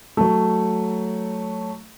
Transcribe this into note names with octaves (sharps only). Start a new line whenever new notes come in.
F#3 A3